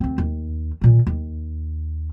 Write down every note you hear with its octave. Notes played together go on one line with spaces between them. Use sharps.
D2 C4
D#2
A#2 D#3
D#2